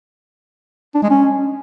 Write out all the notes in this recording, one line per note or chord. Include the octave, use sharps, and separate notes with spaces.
D4
G#3
C#4